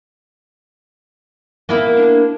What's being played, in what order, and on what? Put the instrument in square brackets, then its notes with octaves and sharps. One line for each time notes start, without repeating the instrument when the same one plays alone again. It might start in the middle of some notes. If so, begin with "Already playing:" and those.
[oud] A#3 B3 E4
[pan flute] D4